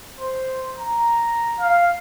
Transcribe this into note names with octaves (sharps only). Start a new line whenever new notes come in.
C5
A#5
F5